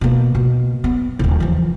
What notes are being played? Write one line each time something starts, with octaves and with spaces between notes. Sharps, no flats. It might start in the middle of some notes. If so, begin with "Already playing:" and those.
B2 A#3
B2
B3
D#1 A2
E3 F3